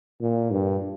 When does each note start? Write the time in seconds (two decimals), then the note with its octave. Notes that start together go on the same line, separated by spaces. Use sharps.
0.21 A#2
0.51 G2